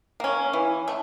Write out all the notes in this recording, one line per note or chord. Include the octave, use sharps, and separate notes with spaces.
A#3 C#4
E3
A3